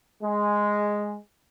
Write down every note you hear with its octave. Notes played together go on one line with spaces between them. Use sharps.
G#3